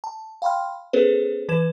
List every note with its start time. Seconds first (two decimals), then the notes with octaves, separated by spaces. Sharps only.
0.04 A5
0.42 F5 G5 B5 C6 F6
0.93 B3 C#4 G#4 A4 B4 C5
1.49 E3 B4 G#6 E7